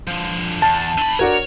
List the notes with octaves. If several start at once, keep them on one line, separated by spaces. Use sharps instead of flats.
D3 F3
E2 A5
D3 B5 D#7
D4 F#4 A#4 C#5